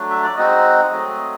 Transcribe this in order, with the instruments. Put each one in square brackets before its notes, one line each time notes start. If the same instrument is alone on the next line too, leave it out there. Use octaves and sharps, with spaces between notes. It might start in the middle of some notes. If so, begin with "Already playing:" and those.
Already playing: [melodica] F#3 A3 D4
E5
D5
G#3 C4 D#4 F#4 D#5
F#3 A3 C4